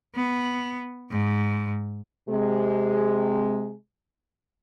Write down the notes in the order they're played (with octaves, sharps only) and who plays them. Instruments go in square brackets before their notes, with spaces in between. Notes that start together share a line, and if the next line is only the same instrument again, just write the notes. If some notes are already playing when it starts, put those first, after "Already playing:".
[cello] B3
G#2
[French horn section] C3 G#3